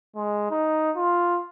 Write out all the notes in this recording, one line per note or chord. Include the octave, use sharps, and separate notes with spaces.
G#3
D#4
F4